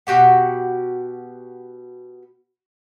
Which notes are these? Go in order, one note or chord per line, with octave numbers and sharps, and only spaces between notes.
B2 F#4 G4 F#5